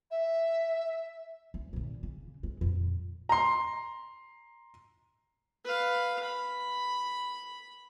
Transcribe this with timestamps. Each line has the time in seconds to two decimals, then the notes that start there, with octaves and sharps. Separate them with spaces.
0.10 E5
1.54 D2
1.73 A#2 D3
2.03 C#3
2.43 G#3
2.61 F2 A#2
3.29 A#5 C6
5.65 B4 F5
6.24 B5